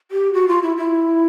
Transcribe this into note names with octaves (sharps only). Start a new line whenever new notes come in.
G4
F#4
F4
E4
E4